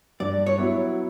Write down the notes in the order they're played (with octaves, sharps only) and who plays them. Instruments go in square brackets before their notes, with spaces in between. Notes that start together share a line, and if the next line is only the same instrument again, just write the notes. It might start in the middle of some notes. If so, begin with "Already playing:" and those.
[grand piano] G2 [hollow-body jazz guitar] D5
[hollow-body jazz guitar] C#5
[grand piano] F#3 B3 E4